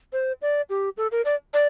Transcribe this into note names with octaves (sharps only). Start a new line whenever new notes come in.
C5
D5
G4
A4
A#4
D5
D5